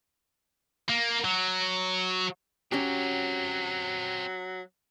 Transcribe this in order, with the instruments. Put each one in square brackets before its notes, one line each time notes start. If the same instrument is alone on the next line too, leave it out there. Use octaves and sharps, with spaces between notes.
[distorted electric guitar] A#3
F#3
[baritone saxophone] F#3 [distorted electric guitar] C4 A#4 [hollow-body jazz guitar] C#4 F#4 G4